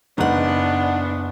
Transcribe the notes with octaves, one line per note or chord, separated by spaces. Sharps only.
F#1 B3 D4 D#4 F#5